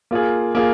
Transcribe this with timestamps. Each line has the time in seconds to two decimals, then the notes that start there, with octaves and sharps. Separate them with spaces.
0.11 A#3 F4 G#4
0.55 A#3 F4 G#4